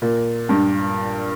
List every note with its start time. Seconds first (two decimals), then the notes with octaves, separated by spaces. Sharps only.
0.02 A#2
0.49 G2